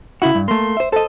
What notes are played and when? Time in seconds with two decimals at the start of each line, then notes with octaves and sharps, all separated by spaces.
0.22 C#3 E4 F#4
0.35 G2
0.48 A3 A#3 C6
0.77 C5 E5
0.92 A4 C5 D#5